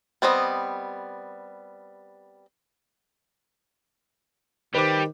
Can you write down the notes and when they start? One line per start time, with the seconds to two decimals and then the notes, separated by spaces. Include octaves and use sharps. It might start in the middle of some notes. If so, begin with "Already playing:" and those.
0.22 G3 B3 C4 D#5
4.75 D#3 G3 B4 C5 D6